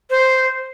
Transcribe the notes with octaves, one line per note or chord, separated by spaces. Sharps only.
C5